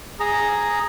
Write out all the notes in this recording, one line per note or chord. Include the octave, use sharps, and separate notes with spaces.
G#4 A#5